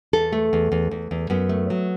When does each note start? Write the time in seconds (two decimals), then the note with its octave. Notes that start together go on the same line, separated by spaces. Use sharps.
0.13 E2 A4
0.33 A3
0.53 E2
0.72 E2
0.91 E2
1.11 E2
1.30 F#2 B3
1.49 A3
1.70 F#3